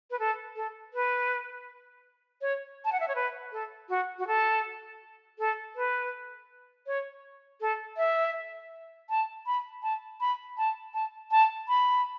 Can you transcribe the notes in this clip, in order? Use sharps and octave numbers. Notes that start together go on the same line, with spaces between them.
B4
A4
A4
B4
C#5
A5
F#5
E5
C#5
B4
A4
F#4
F#4
A4
A4
B4
C#5
A4
E5
A5
B5
A5
B5
A5
A5
A5
B5